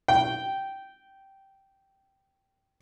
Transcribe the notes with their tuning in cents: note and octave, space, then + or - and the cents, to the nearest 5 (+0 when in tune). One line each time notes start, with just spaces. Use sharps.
G5 -10